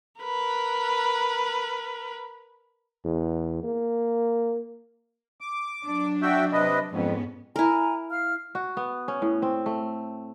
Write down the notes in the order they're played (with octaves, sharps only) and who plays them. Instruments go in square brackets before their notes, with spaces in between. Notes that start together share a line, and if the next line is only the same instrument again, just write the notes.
[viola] A#4 B4
[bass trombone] E2
A#3
[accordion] D6
[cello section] F#3 D4
[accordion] F#4 E5 G5
C3 B4 D#5
[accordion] F2 [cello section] G#2 B3 C#4
[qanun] E4 A#4 [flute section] G#5 A#5
[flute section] F5 F6
[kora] F#4
B3
C#4
A2
C4
A3